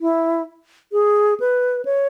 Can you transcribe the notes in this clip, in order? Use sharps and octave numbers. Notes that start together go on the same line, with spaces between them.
E4
G#4
B4
C#5